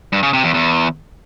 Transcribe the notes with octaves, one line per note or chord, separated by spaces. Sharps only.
G2
C#3
C3
E2
E2